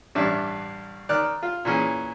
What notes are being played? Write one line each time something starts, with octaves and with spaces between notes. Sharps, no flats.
A1 G2 D4 E5
D#3 D5 F6 F#6
F4
A#2 E3 C#4 G#4